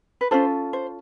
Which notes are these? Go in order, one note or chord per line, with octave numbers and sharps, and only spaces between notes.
B4
C#4 F4 A4 C5
C5